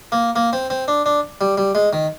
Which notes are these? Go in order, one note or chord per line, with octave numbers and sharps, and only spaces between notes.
A#3
A#3
C4
C4
D4
D4
G3
G3
G#3
D#3